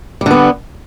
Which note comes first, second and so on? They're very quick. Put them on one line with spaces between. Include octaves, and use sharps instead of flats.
G3 D3 B3